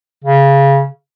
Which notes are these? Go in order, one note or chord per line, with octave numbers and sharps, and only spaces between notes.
C#3